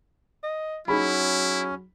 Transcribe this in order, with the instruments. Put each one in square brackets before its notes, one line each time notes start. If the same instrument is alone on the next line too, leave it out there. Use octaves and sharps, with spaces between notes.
[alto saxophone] D#5
[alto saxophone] F#3 [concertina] C#4 [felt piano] D#4 G#4 B5 [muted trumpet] E4